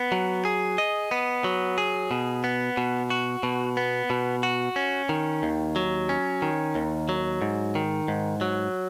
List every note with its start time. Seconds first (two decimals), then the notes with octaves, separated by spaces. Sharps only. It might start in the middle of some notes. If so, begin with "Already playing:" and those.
Already playing: B3
0.12 F#3
0.45 G#4
0.78 D#5
1.11 B3
1.44 F#3
1.78 G#4
2.11 B2
2.44 B3
2.77 B2
3.10 F#4
3.43 B2
3.77 B3
4.10 B2
4.43 F#4
4.76 C#4
5.09 D#3
5.43 D#2
5.76 F#3
6.09 C#4
6.42 D#3
6.75 D#2
7.09 F#3
7.41 G#2
7.75 D#3
8.08 G#2
8.41 F#3